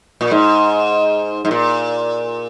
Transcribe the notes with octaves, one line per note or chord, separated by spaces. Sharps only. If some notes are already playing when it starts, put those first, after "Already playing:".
A#2
G#2
G#2
A#2